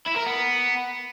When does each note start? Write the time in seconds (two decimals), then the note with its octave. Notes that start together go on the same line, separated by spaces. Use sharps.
0.08 E4
0.17 A#4
0.27 B3